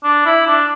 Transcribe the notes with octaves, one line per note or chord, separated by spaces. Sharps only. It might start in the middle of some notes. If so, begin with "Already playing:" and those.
D4
E4
D4